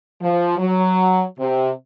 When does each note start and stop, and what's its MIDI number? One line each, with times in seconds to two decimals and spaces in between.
0.22 0.58 53
0.58 1.23 54
1.39 1.70 48